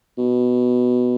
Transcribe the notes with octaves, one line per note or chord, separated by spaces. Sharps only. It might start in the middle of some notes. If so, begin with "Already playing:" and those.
B2